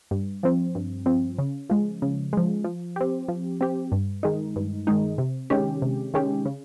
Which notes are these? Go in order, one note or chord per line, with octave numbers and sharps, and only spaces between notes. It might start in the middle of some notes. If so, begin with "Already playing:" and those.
G2
F3 C4
G2
F3 C4
C#3
F3 G#3
C#3
F3 G#3
F3
C4 G4
F3
C4 G4
G2
D#3 G#3 D#4
G2
D#3 G#3 D#4
C3
D#3 G#3 C#4 G4
C3
D#3 G#3 C#4 G4
C#3